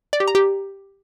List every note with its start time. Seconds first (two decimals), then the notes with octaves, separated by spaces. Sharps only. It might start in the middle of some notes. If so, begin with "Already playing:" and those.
0.13 D5
0.20 G4
0.28 A#5
0.35 G4